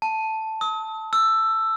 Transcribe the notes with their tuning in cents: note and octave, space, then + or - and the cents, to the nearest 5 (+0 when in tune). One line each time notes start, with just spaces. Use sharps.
A5 +0
D#6 +45
E6 +10